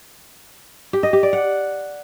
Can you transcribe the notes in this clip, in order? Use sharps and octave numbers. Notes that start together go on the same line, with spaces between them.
G4
D#5
G4
D5
F#5